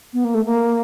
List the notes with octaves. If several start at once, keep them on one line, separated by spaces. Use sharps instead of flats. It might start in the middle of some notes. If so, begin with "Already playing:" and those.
B3
A#3
A3
A#3